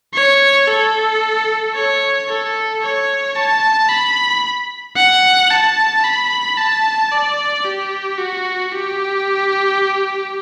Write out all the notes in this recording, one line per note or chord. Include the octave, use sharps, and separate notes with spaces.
C#5
A4
C#5
A4
C#5
A5
B5
F#5
A5
B5
A5
D5
G4
F#4
G4